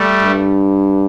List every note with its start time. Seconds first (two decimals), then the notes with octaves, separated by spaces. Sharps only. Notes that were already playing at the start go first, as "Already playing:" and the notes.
Already playing: G3 A3
0.24 G2